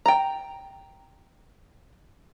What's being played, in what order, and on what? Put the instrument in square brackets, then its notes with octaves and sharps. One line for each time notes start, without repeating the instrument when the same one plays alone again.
[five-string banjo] G5 A#5